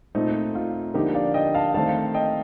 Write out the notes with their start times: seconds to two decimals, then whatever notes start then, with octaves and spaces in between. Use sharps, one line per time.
0.15 A#2 A3 C4 D#4
0.55 F4
0.94 D3 F3 A#3 D#4 G4
1.14 D5 F5
1.34 D#5 G5
1.54 F5 A5
1.74 D#3 A3 C4 F5 A5
2.14 D#5 G5